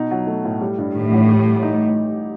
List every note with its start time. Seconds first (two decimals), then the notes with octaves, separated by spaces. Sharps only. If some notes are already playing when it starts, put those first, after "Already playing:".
Already playing: B2 D#4
0.11 F#3
0.27 A3
0.45 A2
0.61 G3
0.78 G2
0.95 A2 D#3
1.11 A1
1.29 G4
1.45 G3
1.63 D#4